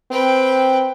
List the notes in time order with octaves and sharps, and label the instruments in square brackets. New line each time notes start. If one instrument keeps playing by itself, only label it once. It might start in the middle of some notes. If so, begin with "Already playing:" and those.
[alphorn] C4 [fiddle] B4 G5